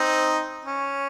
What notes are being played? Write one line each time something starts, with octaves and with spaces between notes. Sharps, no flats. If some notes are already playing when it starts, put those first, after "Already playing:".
Already playing: C4 D#4
C#4